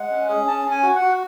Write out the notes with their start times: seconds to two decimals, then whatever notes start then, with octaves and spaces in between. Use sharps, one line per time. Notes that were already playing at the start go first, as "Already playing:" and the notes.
Already playing: G#3 F#5
0.11 C#4
0.29 G#4
0.47 C#4 A5
0.65 C#4
0.71 G#5
0.83 F#4
0.95 F#5
1.02 F#4